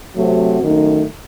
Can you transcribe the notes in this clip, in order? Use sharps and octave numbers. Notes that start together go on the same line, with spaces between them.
C3 F#3 A3 C4 F#4
F#2 D#3 A3 D#4